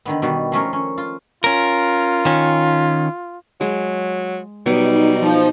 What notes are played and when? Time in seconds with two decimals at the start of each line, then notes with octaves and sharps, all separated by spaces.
0.05 D3 D#3 B3
0.22 B2 D#3 G3 B3
0.52 F3 A3 C#4 A#4
0.73 C#4
0.98 F4
1.44 C#4 F4 A#4
2.25 D#3 C#4
3.61 F#3 G#3
4.66 B2 F#3 G3 D#4
5.20 F3